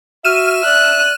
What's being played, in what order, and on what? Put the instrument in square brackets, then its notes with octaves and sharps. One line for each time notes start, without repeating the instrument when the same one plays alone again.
[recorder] F#4 [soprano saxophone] E5 [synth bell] F6 D#7 E7
[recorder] D5 [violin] F#6